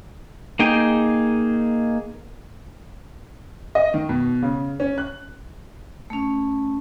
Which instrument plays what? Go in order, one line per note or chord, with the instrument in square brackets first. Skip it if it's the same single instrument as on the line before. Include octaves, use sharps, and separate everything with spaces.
[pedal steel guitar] A#3 D#4 G#4 G5
[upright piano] D#5
D#3
B2
C#3
C#4
F#6
[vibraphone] A3 C#4